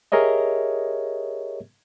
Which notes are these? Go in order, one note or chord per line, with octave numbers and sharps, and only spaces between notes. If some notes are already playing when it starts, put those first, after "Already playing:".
G4 G#4 A#4 C#5 D#5 E5